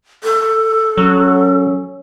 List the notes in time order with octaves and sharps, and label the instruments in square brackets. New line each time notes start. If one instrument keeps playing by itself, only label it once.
[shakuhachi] A4
[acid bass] F#3 [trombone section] C#4